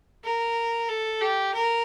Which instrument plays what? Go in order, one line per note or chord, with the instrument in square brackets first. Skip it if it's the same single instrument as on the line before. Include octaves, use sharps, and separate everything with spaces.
[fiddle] A#4
A4
G4
A#4